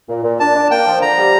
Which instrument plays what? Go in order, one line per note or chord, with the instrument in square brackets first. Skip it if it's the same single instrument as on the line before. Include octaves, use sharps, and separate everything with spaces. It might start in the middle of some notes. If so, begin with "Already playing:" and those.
[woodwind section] A#2
A#2
[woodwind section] D4 [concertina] A5
[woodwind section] D4
[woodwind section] A#3 [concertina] G5
[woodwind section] F3
[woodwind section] D3 [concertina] A#5
[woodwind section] G3